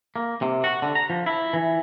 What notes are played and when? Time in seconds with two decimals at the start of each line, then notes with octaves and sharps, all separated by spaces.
0.16 A#3
0.42 C3
0.64 F#4
0.82 D3
0.95 A#5
1.10 F3
1.26 E4
1.53 E3